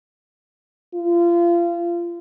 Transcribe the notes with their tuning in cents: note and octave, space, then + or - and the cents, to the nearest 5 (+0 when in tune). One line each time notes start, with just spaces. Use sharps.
F4 -30